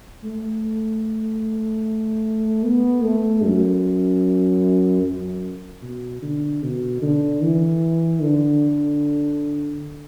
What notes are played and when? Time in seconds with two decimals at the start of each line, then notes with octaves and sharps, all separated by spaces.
0.24 A3
2.64 B3
3.03 A3
3.44 F#2
5.03 F#2
5.82 B2
6.22 D3
6.63 B2
7.02 D3
7.42 E3
8.21 D3